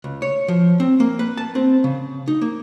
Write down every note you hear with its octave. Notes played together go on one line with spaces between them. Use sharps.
C#2
C#5
F3
C4
A#3
B4
A5
C4
C#3
D#4
A#3